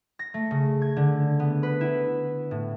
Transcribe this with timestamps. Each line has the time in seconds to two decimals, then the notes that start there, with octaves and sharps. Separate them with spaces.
0.19 A#6
0.34 A3
0.51 C#3
0.82 G#6
0.96 D3
1.40 B3
1.63 B4
1.81 E4
2.51 A2